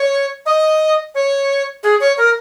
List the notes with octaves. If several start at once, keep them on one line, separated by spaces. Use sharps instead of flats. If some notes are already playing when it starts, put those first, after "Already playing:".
Already playing: C#5
D#5
C#5
G#4
C#5
A#4